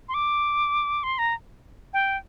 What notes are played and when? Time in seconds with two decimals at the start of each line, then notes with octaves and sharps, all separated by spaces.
0.08 C6
0.14 D6
1.03 C6
1.18 A#5
1.93 G5